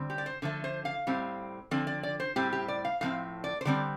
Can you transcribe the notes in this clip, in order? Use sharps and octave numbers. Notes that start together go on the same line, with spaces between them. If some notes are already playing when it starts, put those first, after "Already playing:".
Already playing: D3 G3 C4
G4
D5
C5
D3 F3 A3
C5
F5
A2 G3 C4
D3 F3 C4 D5
D5
D5
C5
A2 G3 C4 G4
G4
D5
F5
A2 F3 C4 F5
D5
C5
D3 G3 C4 D5